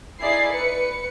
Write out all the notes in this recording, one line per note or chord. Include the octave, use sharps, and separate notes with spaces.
D#4 E4 G#4 D5 C7
B4 C#7